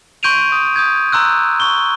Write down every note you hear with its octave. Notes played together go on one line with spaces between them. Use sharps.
C6 C#6 G6 D7 D#7 F7
D#6
D#6 G6 G#6
A#5 C6 E6 F#6
C#6 G7